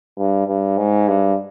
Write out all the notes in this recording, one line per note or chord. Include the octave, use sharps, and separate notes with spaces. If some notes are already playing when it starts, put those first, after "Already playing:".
G2
G2
G#2
G2